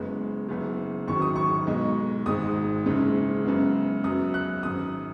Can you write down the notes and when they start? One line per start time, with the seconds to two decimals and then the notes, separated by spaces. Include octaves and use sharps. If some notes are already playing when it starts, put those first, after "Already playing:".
Already playing: F#1 F#2 C#3 G#3 B3
0.49 F#1 F#2 C#3 B3
1.07 G#1 F#2 D#3 F#3 C#6
1.22 D#6
1.36 C#6
1.67 B1 B2 G#3
2.26 G#1 G#2 G#3 D#6
2.86 F#1 F#2 C#3 G#3
3.45 F#2 C#3 G#3 B3
4.04 F#2 F#3 B3 D#6
4.34 F#6
4.63 G#1 F#2 F#3 D#6